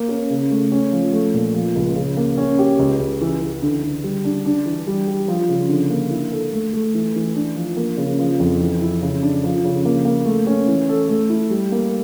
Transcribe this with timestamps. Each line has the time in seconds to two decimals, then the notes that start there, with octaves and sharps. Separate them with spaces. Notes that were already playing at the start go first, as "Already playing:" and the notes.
Already playing: A#3
0.08 C#4
0.30 C#3
0.51 A3
0.72 C#4
0.92 F3
1.13 A3
1.34 A#2
1.54 F3
1.75 C#2
1.96 C#3
2.17 A#3
2.37 C#4
2.59 G4
2.79 C#2
2.99 C#2
3.21 E3
3.41 E3
3.62 D3
3.83 D3
4.04 G3
4.24 D4
4.45 D4
4.65 E3
4.87 G3
5.07 G4
5.28 F3
5.49 C#3
5.69 D3
5.90 A#3
6.10 E4
6.31 A4
6.53 A3
6.73 A3
6.94 E3
7.15 E3
7.35 D4
7.56 F3
7.76 A#3
7.97 C#3
8.19 F3
8.40 F2
8.60 E3
8.81 E4
9.02 C#3
9.22 D4
9.44 F3
9.64 C#3
9.85 A#3
10.05 A#3
10.26 A3
10.46 C#4
10.67 E3
10.89 A4
11.09 A3
11.30 E4
11.50 G3
11.72 A#3